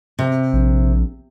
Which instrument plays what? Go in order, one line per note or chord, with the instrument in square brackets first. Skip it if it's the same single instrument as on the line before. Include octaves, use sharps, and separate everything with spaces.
[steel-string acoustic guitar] C3
[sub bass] A#1